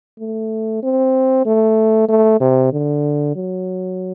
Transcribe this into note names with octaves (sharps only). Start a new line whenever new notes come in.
A3
C4
A3
A3
C3
D3
F#3